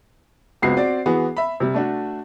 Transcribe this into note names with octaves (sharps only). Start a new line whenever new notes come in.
C#2 B3 C4 F#4 C7
C4 F#4 D5
E3 B3 F#4 G#4
E5 B5
C3 G3
A3 D4 F#4